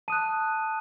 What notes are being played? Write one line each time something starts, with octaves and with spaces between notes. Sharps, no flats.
A5 D#6 F#6 D#7